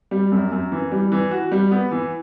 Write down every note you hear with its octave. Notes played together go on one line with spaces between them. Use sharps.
G3
F#2
F#2
E3
G3
E3
F#4
G3
B3
E3